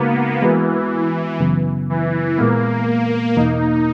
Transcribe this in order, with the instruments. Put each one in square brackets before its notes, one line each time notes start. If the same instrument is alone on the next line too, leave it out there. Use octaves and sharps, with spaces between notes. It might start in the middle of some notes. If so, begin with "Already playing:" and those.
Already playing: [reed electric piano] C#3 G#3 D#4 F#4 [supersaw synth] A#3 B3
[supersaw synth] E3 [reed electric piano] G#3 B3 F#4 B4
[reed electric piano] F#2 C#3 F#3 B3
[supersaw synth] E3
[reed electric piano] A#2 G#3 B3 [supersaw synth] A#3
[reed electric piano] E2 B2 A#3 [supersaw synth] D#4